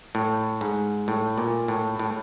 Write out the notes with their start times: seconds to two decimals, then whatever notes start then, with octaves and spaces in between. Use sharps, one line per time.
0.15 A2
0.61 G#2
1.08 A2
1.38 A#2
1.68 A2
1.99 A2